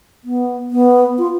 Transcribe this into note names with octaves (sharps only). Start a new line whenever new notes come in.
B3
B3
F4